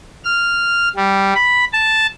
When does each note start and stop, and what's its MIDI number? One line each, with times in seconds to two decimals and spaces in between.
0.24 0.88 89
0.96 1.33 55
1.35 1.64 83
1.72 2.06 81